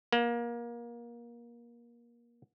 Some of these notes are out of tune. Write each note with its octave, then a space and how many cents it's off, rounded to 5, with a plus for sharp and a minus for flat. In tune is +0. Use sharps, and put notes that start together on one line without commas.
A#3 +25